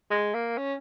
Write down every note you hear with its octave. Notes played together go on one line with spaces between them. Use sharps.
G#3
A#3
C#4